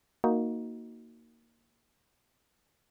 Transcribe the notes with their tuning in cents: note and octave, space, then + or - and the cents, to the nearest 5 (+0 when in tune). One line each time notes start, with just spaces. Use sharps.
A#3 +0 D#4 +15 F#4 +0